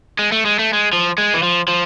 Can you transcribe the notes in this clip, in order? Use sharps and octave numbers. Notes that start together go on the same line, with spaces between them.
G#3
A3
G#3
A3
G#3
F3
G#3
E3
F3
F3